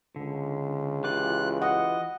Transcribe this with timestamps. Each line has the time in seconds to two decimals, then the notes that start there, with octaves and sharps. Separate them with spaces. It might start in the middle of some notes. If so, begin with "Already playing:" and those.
0.16 C#2 D3
1.04 E3 F4 G4 F#6
1.62 D#5 F#5